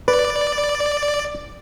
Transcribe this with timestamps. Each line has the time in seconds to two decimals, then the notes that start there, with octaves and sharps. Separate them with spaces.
0.08 B4 D5